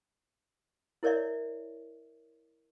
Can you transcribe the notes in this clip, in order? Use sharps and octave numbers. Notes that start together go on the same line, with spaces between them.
E4 A#4 C#5 D5 E5